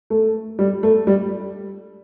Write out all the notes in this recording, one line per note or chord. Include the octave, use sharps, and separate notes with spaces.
A3
G3
A3
G3